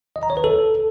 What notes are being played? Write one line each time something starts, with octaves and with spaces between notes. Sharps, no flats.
D#5
A#5
C#5
B4
A4